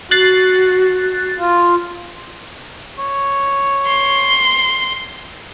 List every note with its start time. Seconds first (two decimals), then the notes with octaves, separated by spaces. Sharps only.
0.11 F#4 F#6 A6 C7
1.38 F4
2.98 C#5
3.87 C6